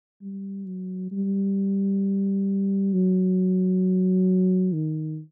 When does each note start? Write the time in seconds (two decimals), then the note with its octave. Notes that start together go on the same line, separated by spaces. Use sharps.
0.22 G3
0.67 F#3
1.12 G3
2.93 F#3
4.73 D#3